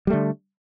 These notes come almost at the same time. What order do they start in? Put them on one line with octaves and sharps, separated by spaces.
G3 A3 D3